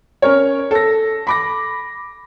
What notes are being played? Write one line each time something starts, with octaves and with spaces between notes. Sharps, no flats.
C#4 A#4 C#5
A4 A#6
B5 D6 A#6